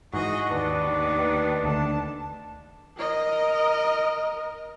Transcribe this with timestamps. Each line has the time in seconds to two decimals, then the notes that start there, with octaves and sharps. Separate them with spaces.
0.14 G#2 E3 F#4 G#4 D#5
0.50 D#2 D#3 D4 B4
1.64 D2 D3 A5
2.97 A#4 D#5